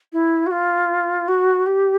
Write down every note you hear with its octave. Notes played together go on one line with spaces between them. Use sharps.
E4
F#4
F4
F#4
G4